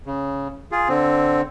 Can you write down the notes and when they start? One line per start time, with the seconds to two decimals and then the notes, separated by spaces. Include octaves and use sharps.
0.06 C#3
0.72 F4 G#4
0.89 D3 C4